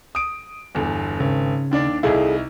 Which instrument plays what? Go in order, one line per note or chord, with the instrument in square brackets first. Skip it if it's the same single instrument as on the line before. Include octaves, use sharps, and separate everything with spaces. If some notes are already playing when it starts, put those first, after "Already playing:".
[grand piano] D#6 D7
G1 E2
[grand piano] G#1 [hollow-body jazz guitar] C#3
[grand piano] D#2 D4 D5
[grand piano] C2 D#4 E4 [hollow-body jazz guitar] G#4 A4 F5